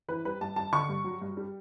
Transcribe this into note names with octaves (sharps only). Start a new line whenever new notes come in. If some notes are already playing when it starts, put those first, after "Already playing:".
E3 B4
G3 B4
G2 A5
G2 A5
D3 C#6
G2
F#3
G2
G3